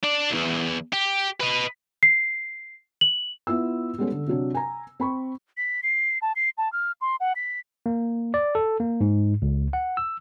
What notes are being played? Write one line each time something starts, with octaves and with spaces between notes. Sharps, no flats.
D4 D5
B1 E2
G4
B4 D#5
C7
F#7
B3 E4 F4 E6
G3 G#3 B3 C#4 G4 A4
D3
C3 F#3 D4
G#5 A#5
C4 B5 C#6
B6
C7
A5
C7
A5
F6
C6
F#5
B6
A#3
D5
A4
A#3
G#2
C#2
F#5
E6